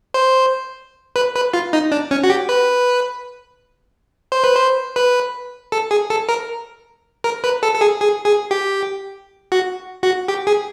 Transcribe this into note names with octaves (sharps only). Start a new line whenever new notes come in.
C5
B4
B4
F4
D#4
D4
C#4
F#4
G4
B4
C5
B4
C5
B4
A4
G#4
A4
A#4
A#4
B4
A4
A4
G#4
G#4
G#4
G4
F#4
F#4
G4
G#4